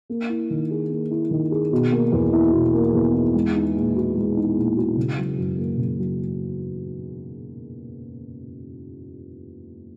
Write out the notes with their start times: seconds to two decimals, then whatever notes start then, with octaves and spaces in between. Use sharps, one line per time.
0.10 A#3
0.29 E4
0.50 D#3
0.71 G#4
0.91 A#3
1.11 E4
1.31 D#3
1.51 G#4
1.72 B2
1.92 A#3
2.12 E2
2.33 E4
2.53 B2
2.73 A#3
2.94 E2
3.15 E4
3.34 G#3
3.55 D#4
3.75 A#2
3.96 F#4
4.16 G#3
4.36 D#4
4.56 A#2
4.77 F#4
4.97 C#3
5.17 F#3
5.38 F#2
5.58 A#3
5.78 C#3
5.99 F#3